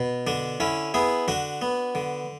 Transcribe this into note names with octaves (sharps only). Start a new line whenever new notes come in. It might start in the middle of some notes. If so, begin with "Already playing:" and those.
Already playing: B2
D3 D4
D3 C#4 E4
B3 E4 G#4
D3 D4 F#4
B3
D3